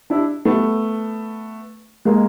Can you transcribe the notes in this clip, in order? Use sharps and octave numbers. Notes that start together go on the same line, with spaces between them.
D4 E4
A3 B3
G#3 A#3